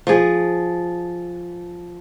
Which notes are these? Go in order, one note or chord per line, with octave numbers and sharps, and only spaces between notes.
F3 G#4